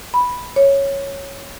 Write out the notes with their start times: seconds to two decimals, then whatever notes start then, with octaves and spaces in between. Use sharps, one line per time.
0.14 B5
0.56 C#5